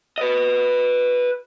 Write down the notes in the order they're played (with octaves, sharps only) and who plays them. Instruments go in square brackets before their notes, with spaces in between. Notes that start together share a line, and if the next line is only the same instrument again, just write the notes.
[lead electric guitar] B4 D#5